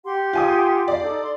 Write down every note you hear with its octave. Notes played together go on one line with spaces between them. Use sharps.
G4 F#5 C6
F4 G#5 D#6
D5 F5
D#4 A4
C6